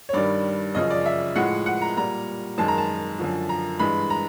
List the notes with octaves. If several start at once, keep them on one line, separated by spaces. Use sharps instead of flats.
C#5
G2 D#3 G3 D5
F#2 C#3 F3 D#5
D5
E5
A2 F3 G#3 F#5
F#5
A#5
A#2 G3 A#5
F#2 D#3 G#3 A5
A#5
A5
F#2 D3 F3
A#5
G2 E3 G#3 B5
A#5